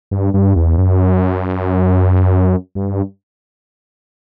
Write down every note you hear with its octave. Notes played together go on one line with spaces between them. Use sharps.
G2
G2
E2
F#2
G2